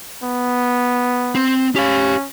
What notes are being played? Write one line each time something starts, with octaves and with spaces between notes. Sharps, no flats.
B3
C4
C#4 G4 F5